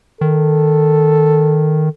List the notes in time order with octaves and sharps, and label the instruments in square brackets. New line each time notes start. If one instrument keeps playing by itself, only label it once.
[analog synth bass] D#3 [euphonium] A4